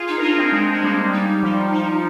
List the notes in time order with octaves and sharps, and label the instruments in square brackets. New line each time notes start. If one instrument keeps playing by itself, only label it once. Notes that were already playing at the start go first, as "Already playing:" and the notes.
Already playing: [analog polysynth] F4 G#4
[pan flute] D#4
[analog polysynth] A#4
[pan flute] D4 [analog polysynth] F4 G#4
[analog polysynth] C4 D#4
G#3 C4
G#3
G3 A#3
[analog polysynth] G3 [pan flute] D#4
[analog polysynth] F3
F3